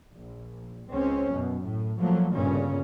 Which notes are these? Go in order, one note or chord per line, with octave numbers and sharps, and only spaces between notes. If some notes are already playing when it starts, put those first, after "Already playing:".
A#1
C#2 C4 C#4
F#2 B2
A2
F3 F#3 A3 A#3
G1 G2 A#2 C#3 C#4